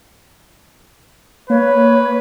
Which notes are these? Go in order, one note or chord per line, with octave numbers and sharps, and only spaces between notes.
A#3 B4 C#5